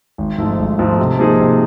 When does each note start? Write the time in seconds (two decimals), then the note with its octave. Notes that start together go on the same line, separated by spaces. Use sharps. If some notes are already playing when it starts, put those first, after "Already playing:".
0.18 G#1
0.38 G#2 F3 A3
0.59 G#1
0.79 G#2 F3 A3
0.99 C3
1.19 F3 A#3 D#4 G#4
1.39 C3